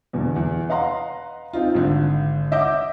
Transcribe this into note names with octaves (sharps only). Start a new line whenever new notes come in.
E2 B2 D3
E2
B4 D#5 F5 F#5 A#5 C6
C4 D#4 F4
G#1 D3
D#5 E5 F#5 D6 G6